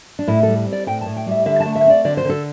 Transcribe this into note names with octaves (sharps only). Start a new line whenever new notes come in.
D4
A2 E4
G3 A4
C4
D5
A2 G5
A2 A5
G5
G3 E5
D3 E5
A5
A3
E5
C4 D5
D3 D5
C5
D3 A4